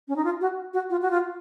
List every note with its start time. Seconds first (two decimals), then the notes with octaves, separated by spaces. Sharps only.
0.08 C#4
0.16 D#4
0.24 F4
0.41 F#4
0.73 F#4
0.90 F4
1.02 F#4
1.11 F4